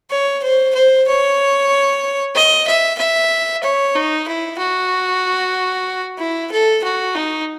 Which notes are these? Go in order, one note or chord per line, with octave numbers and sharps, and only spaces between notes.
C#5
C5
C5
C#5
D#5
E5
E5
C#5
D#4
E4
F#4
E4
A4
F#4
D#4